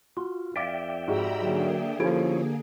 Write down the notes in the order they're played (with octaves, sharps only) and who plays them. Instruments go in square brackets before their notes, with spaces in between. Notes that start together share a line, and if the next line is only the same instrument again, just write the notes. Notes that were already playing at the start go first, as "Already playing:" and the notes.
[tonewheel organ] F4 [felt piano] F#4
[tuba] F2 [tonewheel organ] D5 E5 G5 [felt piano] F5 D6
[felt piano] G#2 F#4 G4 [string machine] A#5 B5 E6
[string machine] D3 A#3 G#4 [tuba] F#3
[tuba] F3 [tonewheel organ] C#4 E4 C#5 [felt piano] G4 A4 D7